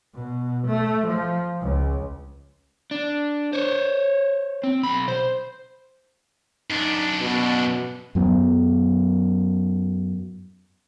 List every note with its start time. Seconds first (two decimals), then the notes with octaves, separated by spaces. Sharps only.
0.15 B2
0.67 A3
1.07 F3
1.62 C#2
2.91 D4
3.53 C5 C#5
4.64 C4
4.83 B1 B5
5.08 C5
6.70 F#2 D4 D#4
7.21 B2
8.15 F#2 F#3 B3